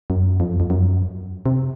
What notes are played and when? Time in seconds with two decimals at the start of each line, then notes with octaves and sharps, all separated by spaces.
0.10 F#2
0.40 F2
0.60 F2
0.70 F#2
1.46 C3